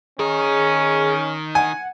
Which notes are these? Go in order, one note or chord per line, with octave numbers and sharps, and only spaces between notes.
D#3 C#4 D#4 G#4
F#5 G#5